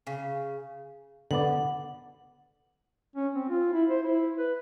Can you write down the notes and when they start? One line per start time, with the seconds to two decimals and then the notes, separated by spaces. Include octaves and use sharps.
0.07 C#3
1.31 D3 B3 D5 F#5
3.15 C#4
3.35 C4
3.49 F4
3.73 E4
3.89 C5
4.03 E4
4.38 B4